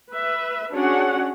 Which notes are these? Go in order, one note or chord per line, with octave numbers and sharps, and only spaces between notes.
B4 E5
C#4 D4 F#4 G#4 C#5 F#5